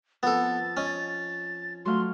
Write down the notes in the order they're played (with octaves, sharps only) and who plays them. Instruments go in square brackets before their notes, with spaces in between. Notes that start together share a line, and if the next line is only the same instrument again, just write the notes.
[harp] F3 C4 [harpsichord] B3 A4 [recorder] A6
[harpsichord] C#4 [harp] D#5
[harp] F#3 A3 F5 [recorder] C6